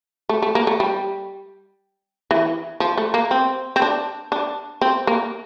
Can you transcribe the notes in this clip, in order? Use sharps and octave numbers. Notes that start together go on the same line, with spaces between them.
A3
A3
A#3
A3
G3
E3
F3
A3
A#3
C4
C4
D4
D4
C4
A#3